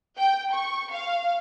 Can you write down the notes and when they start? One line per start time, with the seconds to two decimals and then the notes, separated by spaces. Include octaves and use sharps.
0.17 G5
0.53 C#6
0.91 F5